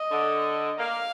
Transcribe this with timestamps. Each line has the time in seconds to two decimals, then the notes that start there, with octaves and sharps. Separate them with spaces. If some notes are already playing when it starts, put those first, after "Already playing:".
Already playing: D#5
0.12 D3
0.78 A#3 F5